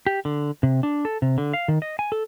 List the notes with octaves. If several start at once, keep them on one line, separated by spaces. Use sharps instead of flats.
G4
D3
C3
D4
A4
C3
D3
F5
D#3
D#5
G#5
A4